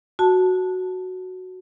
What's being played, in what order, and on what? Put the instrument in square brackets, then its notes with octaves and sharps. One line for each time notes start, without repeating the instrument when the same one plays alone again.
[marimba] F#4 A5